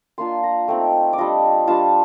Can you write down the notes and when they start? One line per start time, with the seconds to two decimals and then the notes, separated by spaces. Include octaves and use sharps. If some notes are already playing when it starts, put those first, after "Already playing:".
0.18 A#3 D4 F4 C6
0.43 A#5
0.68 A3 C4 D#4 G5
1.13 D5
1.18 G3 D4 F4 D#5
1.67 G3 D4 F4 A5